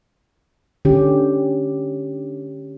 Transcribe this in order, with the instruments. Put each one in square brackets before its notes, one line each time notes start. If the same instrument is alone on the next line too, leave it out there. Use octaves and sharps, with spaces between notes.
[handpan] D3 C#4 G4